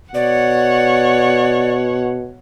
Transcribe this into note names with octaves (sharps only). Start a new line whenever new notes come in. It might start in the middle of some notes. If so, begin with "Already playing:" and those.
B2 C#5 D5 F#5